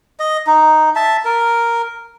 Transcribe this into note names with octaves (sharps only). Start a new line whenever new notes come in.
D#5
D#4
E5 A5
A#4